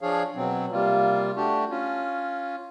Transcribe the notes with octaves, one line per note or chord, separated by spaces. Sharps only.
F3 D4 G#4 C#5 F5
B2 F#3 C4
C3 G3 A#3 F4
A3 D4 F#4 G4
C#4 F4